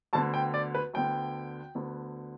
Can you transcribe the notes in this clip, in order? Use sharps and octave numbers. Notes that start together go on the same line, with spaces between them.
D2 D3 B3 A5
G5
D5
B4
D2 D3 B3 G5
D2 D3 B3